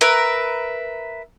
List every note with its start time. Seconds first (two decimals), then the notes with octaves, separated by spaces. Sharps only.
0.01 A#4 B4 E5